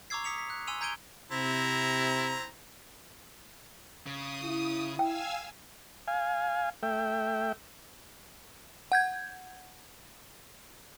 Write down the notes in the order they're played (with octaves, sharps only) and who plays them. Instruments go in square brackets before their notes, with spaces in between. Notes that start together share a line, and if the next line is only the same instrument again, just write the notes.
[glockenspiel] A#5 C#6 D6 E6 G#6 C7
D#6 B6 C#7 F7
B6
F#6
G#5 C6 E6 D#7 F7
A#5 G6 G#6 D7 D#7 G7
[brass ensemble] C3 [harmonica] C4 A#5 [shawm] E4
[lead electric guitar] C#3 [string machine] D#6
[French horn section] E4
[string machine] F5 G#5 E6 [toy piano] G5
[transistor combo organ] F5 G#5
A3 E5 G5
[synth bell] F#5 G6 G#6